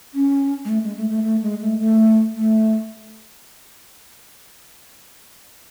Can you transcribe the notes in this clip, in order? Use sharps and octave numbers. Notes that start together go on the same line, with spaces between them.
C#4
G#3
A3
G#3
A3
A3
A3
G#3
A3
A3
A3